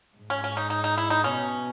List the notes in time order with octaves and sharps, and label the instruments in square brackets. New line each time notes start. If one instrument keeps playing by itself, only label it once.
[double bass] G#2
[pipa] C#4
C#4
D#4
D#4
D#4
E4
D#4
[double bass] B2 [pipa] C#4